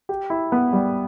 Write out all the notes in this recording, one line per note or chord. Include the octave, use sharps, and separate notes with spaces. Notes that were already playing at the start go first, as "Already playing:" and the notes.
G4
E4
B3
G3